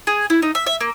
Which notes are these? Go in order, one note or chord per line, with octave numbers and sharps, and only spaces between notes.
G#4
E4
D#4
E5
E5
A#3